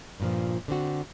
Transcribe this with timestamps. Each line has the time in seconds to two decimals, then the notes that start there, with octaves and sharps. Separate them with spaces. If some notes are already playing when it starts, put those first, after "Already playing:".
0.20 G2 A#2 F3
0.68 D3 C4 F#4